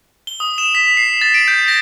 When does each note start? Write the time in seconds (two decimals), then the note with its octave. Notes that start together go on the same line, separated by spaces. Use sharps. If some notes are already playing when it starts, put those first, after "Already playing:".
0.27 G7
0.40 D#6
0.58 E7
0.75 B6
0.97 C7
1.21 A6
1.34 D7
1.48 G6
1.68 A#6